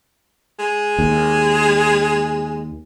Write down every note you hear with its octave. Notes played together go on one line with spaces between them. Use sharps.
G#3
D#2